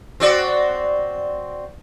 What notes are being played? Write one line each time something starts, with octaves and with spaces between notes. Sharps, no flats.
C4 F#4 D5